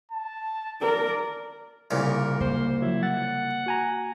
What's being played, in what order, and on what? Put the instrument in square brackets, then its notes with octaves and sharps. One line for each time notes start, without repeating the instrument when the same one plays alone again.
[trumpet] A5
[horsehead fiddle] A#4 D5
[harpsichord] C2 A#2 C#3 [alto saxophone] A#4
[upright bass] A#3 [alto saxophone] C5
[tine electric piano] F3 F#3 [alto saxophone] E4
[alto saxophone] F#5 [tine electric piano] A6
[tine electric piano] F#4 G#5 A#5